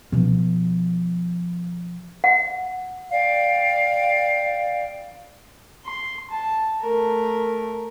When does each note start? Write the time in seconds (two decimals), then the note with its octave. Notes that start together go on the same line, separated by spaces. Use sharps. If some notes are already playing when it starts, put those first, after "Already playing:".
0.12 B2 F3
2.24 F#5
3.11 D5 F5 G5
5.85 C6
6.31 A5
6.82 A3 A#4